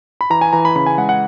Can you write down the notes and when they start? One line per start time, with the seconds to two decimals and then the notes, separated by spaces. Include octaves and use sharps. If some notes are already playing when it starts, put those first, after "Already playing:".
0.21 B5
0.30 E3 A#5
0.41 G#5
0.53 E3 A#5
0.65 B5
0.76 C#3 B5
0.86 G#5
0.98 G#3 F#5
1.09 F#5